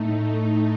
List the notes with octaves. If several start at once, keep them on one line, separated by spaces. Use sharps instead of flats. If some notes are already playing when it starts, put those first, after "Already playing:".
Already playing: A2 A3 D#4